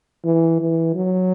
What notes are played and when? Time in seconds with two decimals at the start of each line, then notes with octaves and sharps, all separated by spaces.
0.25 E3
0.61 E3
0.95 F#3